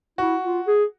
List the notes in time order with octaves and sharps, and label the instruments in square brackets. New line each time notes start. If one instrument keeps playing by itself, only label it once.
[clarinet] E4 [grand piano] F#4
[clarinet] F4
G#4